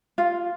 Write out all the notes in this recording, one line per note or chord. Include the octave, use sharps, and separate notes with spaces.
F4